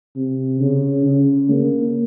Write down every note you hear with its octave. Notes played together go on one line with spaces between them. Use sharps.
C3
C#3
C#3
A#3